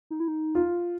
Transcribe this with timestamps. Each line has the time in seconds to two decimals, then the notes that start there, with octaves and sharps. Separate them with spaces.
0.10 D#4
0.20 E4
0.28 D#4
0.55 F4